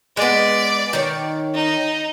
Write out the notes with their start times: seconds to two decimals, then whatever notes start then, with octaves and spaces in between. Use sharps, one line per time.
0.17 G#3 B3 D5
0.93 D#3 C#5
1.55 D#4